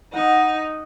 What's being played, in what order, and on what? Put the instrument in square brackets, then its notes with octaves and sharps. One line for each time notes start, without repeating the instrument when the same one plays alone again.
[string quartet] D#4 [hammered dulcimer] D#5 F#5